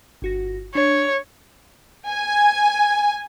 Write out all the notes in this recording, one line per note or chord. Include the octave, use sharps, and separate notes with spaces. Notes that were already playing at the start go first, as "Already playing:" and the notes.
G1 F#4 A#6
D4 C#5
G#5